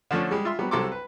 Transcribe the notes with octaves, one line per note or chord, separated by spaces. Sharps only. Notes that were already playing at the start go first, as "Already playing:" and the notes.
D3 F3 A3 C#4 D4
G3 G#3
F4 E5 C6
F#3 G3 B3
C2 C3 F#3 A4 C6 D6
B4